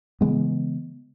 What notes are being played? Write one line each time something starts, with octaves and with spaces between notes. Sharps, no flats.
C#3 E3 G#3 B3